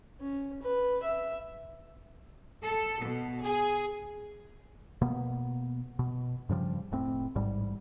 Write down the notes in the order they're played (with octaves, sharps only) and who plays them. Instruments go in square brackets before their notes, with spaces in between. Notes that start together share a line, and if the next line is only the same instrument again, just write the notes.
[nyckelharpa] C#4
B4
E5
[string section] A4
B2
G#4
[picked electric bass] B2 A#3 B3
B2
G2 C#3 F3 G3
F1 A2 C4
A1 G#2 G3